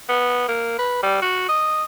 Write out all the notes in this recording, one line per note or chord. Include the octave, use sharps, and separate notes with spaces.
B3
A#3
B4
G3
F#4
D#5